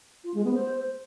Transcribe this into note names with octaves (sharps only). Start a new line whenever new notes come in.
F4
G#3
B3
C5